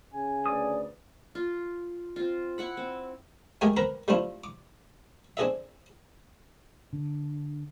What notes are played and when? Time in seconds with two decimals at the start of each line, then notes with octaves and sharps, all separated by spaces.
0.13 C#3 G#5
0.46 D2 B4 D5 D#6
1.35 F4
2.16 C4 F4
2.58 E4 F#5 B5
2.77 C4
3.61 G#3 A3 G4 G#4 A#4 G5
3.77 C4 A#4 B4 A#5
4.08 G3 A3 C4 D4 E4 F4
4.44 D6
5.37 C4 D4 G#4 A4 D#5 E5
6.93 D3